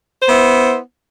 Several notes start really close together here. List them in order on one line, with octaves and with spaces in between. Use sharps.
C5 B3 E4